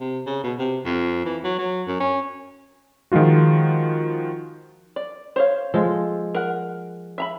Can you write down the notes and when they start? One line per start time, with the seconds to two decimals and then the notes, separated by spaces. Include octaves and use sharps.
0.01 C3
0.26 C#3
0.44 B2
0.59 C3
0.85 F2
1.25 E3
1.44 F#3
1.59 F#3
1.87 F#2
2.00 C#4
3.12 D#3 F3 G#3 F4 F#4
4.96 D5
5.36 C5 C#5 F5
5.74 F3 G#3 A4
6.35 A#4 F#5
7.18 E5 A#5 B5